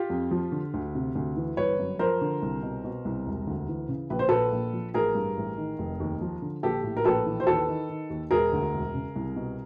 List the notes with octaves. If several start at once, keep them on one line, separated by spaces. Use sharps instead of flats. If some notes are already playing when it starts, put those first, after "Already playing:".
Already playing: F4 G4
F2
F3
D3
D2
C3
D2
E3
G1 B4 C#5
F#2
F3 A#4 C5
D3
C2
B2
B2
C2
E1
D2
E3
C#3
A#1 B4
C5
A#2 A4 B4
A#1
F3
A1 G#4 A#4
G2
A1
D#3
F1
D#2
F3
D3
A#1 G4 A4
A2
A#4
A#1 A4 B4
E3
C5
D#2 A4 B4
D#3
D#3
D#2
E1 G#4 A#4
D2
E1
C#3
C2
B2